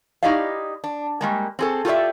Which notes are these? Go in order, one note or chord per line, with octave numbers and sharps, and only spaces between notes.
D#4 E4 G4 D5 D#5 F5
D4
G3 G#3 A#3
C4 G#4 A4
F4 G4 A4 B4 D5 E5